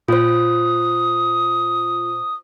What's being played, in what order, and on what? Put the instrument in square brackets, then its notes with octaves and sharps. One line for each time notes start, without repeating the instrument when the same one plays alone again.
[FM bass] A#2 [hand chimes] F4 C5 [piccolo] D#6